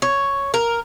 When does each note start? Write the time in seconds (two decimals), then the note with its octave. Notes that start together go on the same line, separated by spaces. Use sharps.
0.02 C#5
0.54 A#4